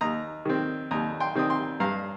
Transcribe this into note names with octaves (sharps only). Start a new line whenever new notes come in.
D#2 A#5 D#6
D#3 C4
D#2 A#5 D#6
G5 C6
D#3 C4 D#6
G5 C6
G2 F5 A#5